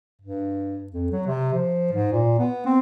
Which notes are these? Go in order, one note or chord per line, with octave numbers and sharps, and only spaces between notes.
G2
F2
F#3
C3
F3
G#2
A#2
B3
C4